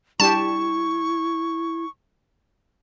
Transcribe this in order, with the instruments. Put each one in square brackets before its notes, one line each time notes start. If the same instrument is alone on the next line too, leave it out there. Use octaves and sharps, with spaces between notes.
[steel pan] G3 D4 G4 [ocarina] E4 [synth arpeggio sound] A5 [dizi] C#6